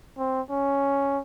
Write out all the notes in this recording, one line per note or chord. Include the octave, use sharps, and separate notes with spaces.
C4
C#4